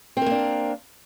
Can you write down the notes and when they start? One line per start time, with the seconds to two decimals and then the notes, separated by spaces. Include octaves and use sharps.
0.17 C4
0.22 A#4
0.26 A#3
0.31 D4